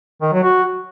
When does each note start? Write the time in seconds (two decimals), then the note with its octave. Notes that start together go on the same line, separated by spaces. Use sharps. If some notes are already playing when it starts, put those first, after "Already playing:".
0.21 D#3
0.32 F#3
0.43 F#4